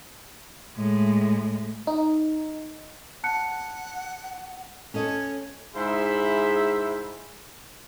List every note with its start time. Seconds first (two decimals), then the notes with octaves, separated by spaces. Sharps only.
0.75 A2 G#3
1.87 D#4
3.24 F#5 A5 F#6 C#7
4.94 C#4 A4 C#5 D#5
5.75 G#2 E4 G#4 C5 E5 B5